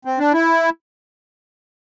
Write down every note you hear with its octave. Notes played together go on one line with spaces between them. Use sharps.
C4
D4
E4